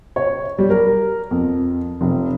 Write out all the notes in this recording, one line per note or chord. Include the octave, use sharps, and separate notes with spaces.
C#5
G3
A#4
F2
F1